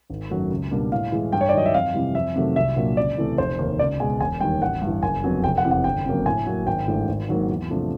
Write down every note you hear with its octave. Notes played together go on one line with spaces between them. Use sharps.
G#1
F#2 D#3 F#3 A3
C#2
B2 G3 A#3 D4
A2 F5
E3 G#3
G2 G5
C#5
D5
D#3 F#3 D#5
E5
F2 F5
C3 E3 G3
F2 E5
C3 D#3 F#3 A3
C2 E5
A#2 F#3 A#3 D4
C#2 D5
C3 E3 A3
F1 C5
D#2 D#3
C#2 D5
B2 G#3 G#5
E1 G#5
D#2 D#3 G3 G5
A1 F#5
G2
E3
F#1 G#5
F2 D3 F#3 B3
F1 G5
F#5
E2 C3 E3
F#5
G1 G5
F2 C#3 F#3 A#3
A2 G#5
F#3 A#3
G#1 G5
G#2 E3 A3 D4
G#1
G#2 D#3 F#3 A#3
E2
C3 F3 A3 D4